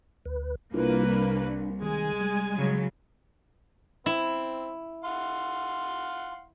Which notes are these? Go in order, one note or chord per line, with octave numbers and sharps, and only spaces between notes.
D2 B4
C2 A#3 D4 E4 F4 B4
D4
D#3 G#3 G#5
G3
C#3 F#3
C4 E4
F5 F#5 C6